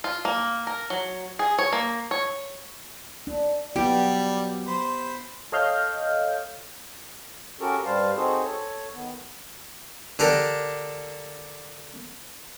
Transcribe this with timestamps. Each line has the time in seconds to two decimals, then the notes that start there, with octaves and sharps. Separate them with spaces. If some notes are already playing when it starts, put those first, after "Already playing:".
0.04 F4
0.25 A#3
0.67 A#4
0.90 F#3
1.39 G#4
1.58 C#5
1.73 A#3
2.11 C#5
3.27 D4
3.76 F#3 G3 B3 G4
4.67 C5 B5
5.52 A4 C#5 D#5 F5 F6 G6
7.60 C#4 F#4 G4 A4 A#4
7.85 G2 G3 C5 F5 A5
8.16 C4 D#4 F#4 G#4 A4 C5
8.44 A4 C#5
8.93 D#3 B3
10.19 D3 D4 G4 A#4